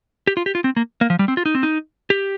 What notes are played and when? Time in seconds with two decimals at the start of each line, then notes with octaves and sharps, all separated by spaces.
0.27 G4
0.37 F4
0.46 G4
0.55 F4
0.64 C4
0.77 A#3
1.01 A#3
1.10 F3
1.19 G3
1.28 C4
1.37 F4
1.46 D#4
1.55 C4
1.63 D#4
2.10 G4